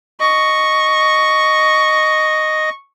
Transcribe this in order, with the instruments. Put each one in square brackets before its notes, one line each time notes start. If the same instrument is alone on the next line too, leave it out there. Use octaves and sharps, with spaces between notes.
[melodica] D#5 [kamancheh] C#6